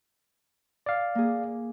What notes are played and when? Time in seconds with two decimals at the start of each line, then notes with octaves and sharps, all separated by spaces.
0.86 D5 F5
1.15 A#3 G#4